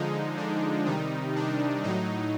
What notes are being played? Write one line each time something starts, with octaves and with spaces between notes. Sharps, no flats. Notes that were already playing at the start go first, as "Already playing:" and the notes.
Already playing: D3 F3 G#3 D#4
D4
C3 D#3 G3 D#4
D4
A2 F#3 D#4